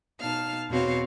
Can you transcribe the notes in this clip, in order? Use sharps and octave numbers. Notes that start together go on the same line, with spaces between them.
B2 D#4 F5 A5 F6
E2 B2 C4 F#4 C#5 F5